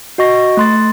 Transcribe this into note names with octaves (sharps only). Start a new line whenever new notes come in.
F#4 D#5 C#6 A#6
A3 C6 A6